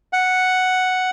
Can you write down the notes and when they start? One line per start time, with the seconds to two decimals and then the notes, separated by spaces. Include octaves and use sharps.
0.13 F#5